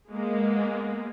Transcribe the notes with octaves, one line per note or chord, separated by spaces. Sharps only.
G#3 A#3 B3